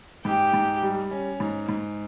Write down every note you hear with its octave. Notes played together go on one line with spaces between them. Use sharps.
G#2 G4
G#2
G3
C#4
G#2
G#2